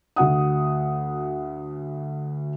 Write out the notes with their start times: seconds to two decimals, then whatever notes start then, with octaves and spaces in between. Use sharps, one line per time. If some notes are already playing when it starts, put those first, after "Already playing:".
0.16 D2 F#4 F#5 D#6